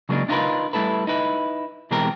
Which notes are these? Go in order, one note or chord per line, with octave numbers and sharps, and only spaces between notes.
C#3 F#3 G#3 A#3 D4
D4 D#4 F4 G#4 A#4 B4
G3 A3 E4 A4 B4
D#4 E4 B4
B2 E3 G#3 C4 G4 A#4